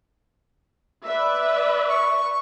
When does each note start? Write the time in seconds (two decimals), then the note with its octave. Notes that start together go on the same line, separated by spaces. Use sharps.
1.05 B4 D5 E5
1.89 C#6